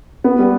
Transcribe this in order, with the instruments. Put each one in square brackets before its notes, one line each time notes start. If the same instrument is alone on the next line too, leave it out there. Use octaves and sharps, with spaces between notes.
[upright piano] B3
G3